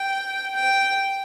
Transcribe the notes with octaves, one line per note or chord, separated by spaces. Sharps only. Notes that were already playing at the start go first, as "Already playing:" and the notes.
Already playing: G5
G5